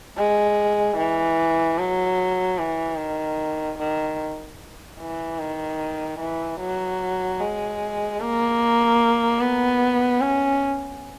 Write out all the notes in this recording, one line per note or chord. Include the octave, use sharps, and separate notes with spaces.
G#3
E3
F#3
E3
D#3
D#3
E3
D#3
E3
F#3
G#3
A#3
B3
C#4